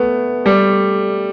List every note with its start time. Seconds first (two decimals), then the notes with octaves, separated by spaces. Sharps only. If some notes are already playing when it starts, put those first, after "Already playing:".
Already playing: A3 B3
0.46 G3